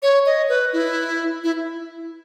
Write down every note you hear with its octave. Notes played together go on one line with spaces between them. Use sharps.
C#5
D#5
B4
E4
E4